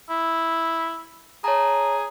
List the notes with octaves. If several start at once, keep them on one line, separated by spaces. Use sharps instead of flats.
E4
G#4 C#5 A5 A#5